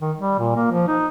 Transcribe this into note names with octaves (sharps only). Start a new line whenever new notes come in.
D#3
G3
A#2
A#3
F3
D#4